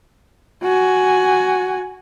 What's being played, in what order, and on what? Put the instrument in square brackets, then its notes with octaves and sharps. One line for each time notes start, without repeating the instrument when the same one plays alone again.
[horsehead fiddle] F#4 G#5